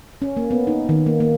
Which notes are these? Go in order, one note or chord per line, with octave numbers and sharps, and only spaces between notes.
C#4
A#3
B3
D#4
D#3
A#3
A#3